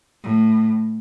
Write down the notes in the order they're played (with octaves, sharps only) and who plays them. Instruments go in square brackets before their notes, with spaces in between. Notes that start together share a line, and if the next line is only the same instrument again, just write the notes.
[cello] A2